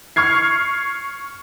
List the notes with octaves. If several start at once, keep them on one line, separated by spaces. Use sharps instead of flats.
C#6 F6 G#6 C7